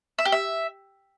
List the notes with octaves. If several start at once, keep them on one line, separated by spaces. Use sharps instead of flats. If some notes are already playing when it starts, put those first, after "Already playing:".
E5
G4
E5